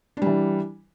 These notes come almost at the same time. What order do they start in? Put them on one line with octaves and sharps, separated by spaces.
D4 G3 E3